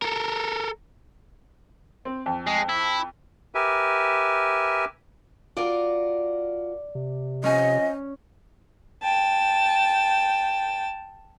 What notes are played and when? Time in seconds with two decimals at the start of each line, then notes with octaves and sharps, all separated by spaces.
0.02 A4 A#4
2.05 C4
2.26 F2
2.47 G#3
2.69 E4
3.55 G4 A#4 B4 E5 G#5
5.57 F4 F#4 A#4 D5
6.95 C3
7.44 F2 C#4 D#5 G#5
9.03 G5 A5